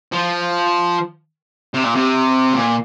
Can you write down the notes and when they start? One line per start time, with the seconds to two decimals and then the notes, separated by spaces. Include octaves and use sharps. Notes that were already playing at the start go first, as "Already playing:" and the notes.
0.12 F3
1.74 C3
1.84 A#2
1.95 C3
2.54 A#2